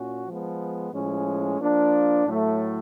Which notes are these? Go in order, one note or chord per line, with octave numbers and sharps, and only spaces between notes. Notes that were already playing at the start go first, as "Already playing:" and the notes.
Already playing: A#2 C#4 F#4
F3 G#3 B3
A2 F3 G#3 C#4
F3 A#3 D4
A2 F#3 A3